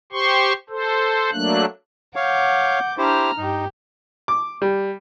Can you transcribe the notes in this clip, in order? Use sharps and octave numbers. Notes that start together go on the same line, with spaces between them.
G4 C5 C6 C#6
A4 C5
F#3 A3 A#3 D4 F#6
C#5 F5 F#5 D6 G6
D4 E4 G4 C5 A#5 F6
G2 D#4 G4
D6
G3